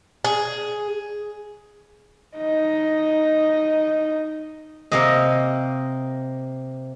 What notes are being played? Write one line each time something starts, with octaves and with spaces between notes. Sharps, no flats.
G#4
D#4 D#5
C3 A#3 D#5